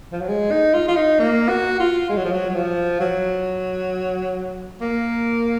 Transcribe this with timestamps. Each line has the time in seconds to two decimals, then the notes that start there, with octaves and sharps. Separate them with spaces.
0.12 F3
0.20 F#3
0.28 G#3
0.51 D#4
0.74 F4
0.88 F4
0.96 D#4
1.19 A#3
1.49 F#4
1.80 F4
2.09 G#3
2.17 F#3
2.25 F3
2.32 F#3
2.50 F#3
2.55 F3
3.00 F#3
4.81 A#3